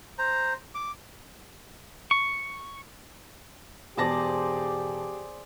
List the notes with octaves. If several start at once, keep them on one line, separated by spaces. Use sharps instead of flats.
C5 A#5
D6
C#6
E1 G4 G#4 C5 D5 A5 A#6